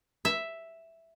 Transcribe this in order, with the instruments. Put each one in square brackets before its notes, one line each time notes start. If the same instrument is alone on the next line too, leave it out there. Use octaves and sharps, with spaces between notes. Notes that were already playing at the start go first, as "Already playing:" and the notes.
[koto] E5